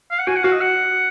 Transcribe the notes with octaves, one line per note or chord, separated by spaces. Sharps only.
F5
F#5
F#4 G#5
F#5
F#4 F5
D#5
F#5